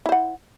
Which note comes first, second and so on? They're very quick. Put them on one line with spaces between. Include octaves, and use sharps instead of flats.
E4 C5 F#5